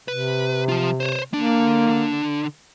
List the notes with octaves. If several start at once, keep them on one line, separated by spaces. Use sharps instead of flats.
C3 B4
F3 F4
C5 C#5
D3 A#3 D4